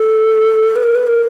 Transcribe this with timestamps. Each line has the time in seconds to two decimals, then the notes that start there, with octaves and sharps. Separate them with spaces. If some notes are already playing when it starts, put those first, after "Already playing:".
Already playing: A4
0.76 B4
0.83 A#4
0.95 B4
1.07 A#4